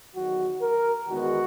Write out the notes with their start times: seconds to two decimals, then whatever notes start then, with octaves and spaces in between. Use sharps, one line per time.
0.14 E2 D#3 F#3 F#4
0.61 A#4
1.08 E2 D#3 G#3 B3 F#4